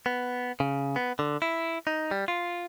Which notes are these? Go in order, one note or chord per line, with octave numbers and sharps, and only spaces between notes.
B3
C#3
B3
D3
E4
D#4
G3
F4